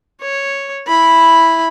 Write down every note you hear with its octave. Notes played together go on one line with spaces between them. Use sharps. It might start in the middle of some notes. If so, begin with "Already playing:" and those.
C#5
E4 B5